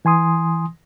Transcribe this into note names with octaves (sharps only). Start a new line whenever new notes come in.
E3 G#5 C6 D#6